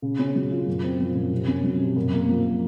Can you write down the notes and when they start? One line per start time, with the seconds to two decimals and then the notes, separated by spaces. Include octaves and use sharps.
0.02 C#3
0.19 C#4
0.35 F#3
0.51 F4
0.67 F#2
0.83 C4
1.00 F3
1.15 F#2
1.32 C3
1.48 C#4
1.63 F#3
1.80 C3
1.96 F#2
2.13 A#3
2.29 F3